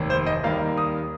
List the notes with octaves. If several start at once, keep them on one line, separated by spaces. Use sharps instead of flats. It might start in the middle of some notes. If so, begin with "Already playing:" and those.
Already playing: F1 D#2 D#3
C5
D#5
D#2 D#3 G3 A#3 F5
D#6